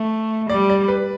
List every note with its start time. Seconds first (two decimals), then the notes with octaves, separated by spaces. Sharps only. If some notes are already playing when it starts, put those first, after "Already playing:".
Already playing: A3
0.49 G3 D5
0.70 D5
0.88 B4